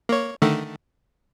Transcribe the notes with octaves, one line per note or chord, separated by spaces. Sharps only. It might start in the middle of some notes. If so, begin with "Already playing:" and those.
A#3 C#5
D3 D#3 A3